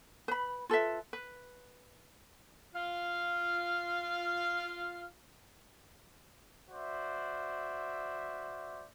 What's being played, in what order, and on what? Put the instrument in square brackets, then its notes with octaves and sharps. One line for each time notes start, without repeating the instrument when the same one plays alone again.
[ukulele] B4 B5
F4 A4 B4 E5
B4
[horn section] F4 F5
[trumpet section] F#4 C5 D5 E5